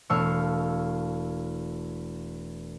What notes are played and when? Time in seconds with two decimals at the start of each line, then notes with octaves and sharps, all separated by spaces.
0.10 E1 A3 F5 C#6 E6